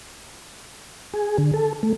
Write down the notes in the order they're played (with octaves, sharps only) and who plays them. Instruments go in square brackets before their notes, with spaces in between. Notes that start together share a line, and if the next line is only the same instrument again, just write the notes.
[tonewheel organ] G#4
D3
A4
A3